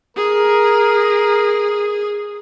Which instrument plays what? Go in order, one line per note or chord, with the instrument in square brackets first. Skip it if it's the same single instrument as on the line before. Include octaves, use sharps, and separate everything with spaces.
[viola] G#4 [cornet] A#4